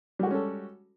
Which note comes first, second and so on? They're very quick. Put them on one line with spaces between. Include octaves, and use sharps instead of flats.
G3 F#4 G#3 C#4 A4